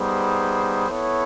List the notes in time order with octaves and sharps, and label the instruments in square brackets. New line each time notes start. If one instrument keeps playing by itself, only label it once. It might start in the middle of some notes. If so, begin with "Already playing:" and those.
Already playing: [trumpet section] G3 B3 D#4 G#4 C5
B3 E4 A4 C#5